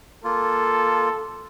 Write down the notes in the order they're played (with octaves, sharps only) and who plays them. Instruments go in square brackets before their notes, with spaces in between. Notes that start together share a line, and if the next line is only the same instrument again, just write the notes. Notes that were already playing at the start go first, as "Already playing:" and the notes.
[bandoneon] A#3 F4 [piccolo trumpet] A4